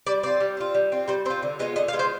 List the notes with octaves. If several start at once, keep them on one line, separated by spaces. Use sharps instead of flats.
G3 D5
C4 F4 D5
G3
C4 F4
G3
C4 F4
G3 C5
C4 F4 C5
D3
G#3 B3 F4 D#5
D3 D#5
F5
G#3 B3 F4
C5